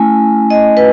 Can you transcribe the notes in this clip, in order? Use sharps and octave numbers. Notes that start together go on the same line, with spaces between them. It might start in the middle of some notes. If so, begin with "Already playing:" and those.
Already playing: A3 C#4 E4 G#5
D#5
B4